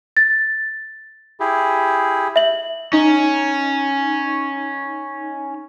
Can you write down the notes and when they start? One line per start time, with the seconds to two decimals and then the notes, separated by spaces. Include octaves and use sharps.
0.17 A6
1.40 E4 G4 G#4
2.36 E5 F#7
2.93 C#4 D#4